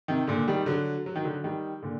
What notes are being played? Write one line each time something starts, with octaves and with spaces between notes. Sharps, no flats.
C3 D#3
A#2 D3
D#3 G3
D3 F#3
F#3
D#3
D3 F#3
D#3 G3
A#2 D3